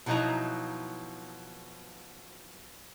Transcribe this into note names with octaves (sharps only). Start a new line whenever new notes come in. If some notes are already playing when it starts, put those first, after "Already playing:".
B2 F3 F#3 D#4 E4 A#5